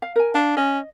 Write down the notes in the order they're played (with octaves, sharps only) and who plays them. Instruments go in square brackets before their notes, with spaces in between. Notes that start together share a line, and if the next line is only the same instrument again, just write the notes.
[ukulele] F5
A#4 G#5
[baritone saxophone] D4 [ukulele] F5
[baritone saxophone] C#4 [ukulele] D#5